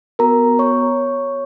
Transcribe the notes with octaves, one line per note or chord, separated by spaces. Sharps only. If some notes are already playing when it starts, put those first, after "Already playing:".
B3 F#4 A#4 A#5
C#5 C#6